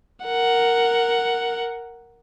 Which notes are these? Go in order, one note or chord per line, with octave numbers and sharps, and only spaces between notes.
A#4 F#5